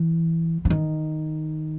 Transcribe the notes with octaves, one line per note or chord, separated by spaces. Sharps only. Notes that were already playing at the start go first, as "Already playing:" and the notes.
Already playing: E3
D3
D#3